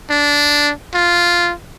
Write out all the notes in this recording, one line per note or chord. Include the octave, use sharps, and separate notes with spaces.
D4
F4